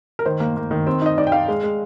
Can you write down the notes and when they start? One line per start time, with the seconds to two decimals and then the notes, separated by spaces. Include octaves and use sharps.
0.19 A#4
0.26 D#3 C5
0.40 A#3
0.57 A#3
0.71 D#3
0.87 C4
1.02 D#4 D#5
1.18 D#4 D5
1.27 G5
1.32 D#4 F5
1.48 G#3
1.63 G#3